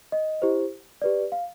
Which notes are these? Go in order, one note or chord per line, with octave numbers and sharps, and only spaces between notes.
D#5
E4 G4 C5
G4 B4 D5
F5